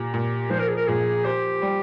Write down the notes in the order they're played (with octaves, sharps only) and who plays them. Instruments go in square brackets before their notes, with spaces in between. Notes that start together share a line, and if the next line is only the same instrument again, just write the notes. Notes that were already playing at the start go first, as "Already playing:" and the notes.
Already playing: [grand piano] A#2 [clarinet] G4
[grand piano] A#2
[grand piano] F3 [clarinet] C5
[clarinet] A#4
G#4
A#4
[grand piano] A#2 [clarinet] G#4
[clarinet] G4 [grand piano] C5
[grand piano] G3